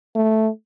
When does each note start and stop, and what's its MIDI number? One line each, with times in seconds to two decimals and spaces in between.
0.15 0.49 57